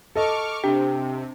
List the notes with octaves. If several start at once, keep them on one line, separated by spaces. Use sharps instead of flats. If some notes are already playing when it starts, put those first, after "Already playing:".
A4 D#5 C#6 D6 F6
C3 D4 G4